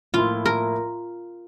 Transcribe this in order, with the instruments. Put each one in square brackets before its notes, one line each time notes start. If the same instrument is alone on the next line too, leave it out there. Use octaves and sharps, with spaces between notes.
[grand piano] A2 F3 A#3 E4 [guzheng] F4
[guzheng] A#4